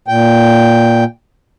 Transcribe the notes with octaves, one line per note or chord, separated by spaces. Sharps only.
A#2 G5